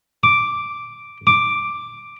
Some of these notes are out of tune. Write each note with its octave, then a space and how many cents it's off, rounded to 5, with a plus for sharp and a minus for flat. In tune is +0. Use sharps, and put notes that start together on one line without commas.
D6 +0
D6 +5